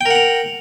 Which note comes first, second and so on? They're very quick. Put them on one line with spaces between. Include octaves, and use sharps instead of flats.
G5 A#4 F#5 A#5